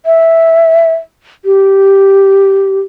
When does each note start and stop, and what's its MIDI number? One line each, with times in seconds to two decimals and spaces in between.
0.06 0.92 76
1.45 2.80 67